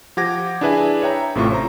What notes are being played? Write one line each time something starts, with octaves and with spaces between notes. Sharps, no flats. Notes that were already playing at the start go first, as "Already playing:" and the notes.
F3 G4 F#5 D6 G#6 A#6
D4 E4 G#4 B4 E5 G#5
C#5 E5 G5 A#5
A1 A2 C3 A3 F4 C#6
C5 A#5